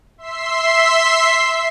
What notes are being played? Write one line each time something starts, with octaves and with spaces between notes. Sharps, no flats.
E5 C6 E6 B6 C7